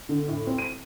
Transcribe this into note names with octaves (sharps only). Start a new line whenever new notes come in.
D3
A2
C4
D#7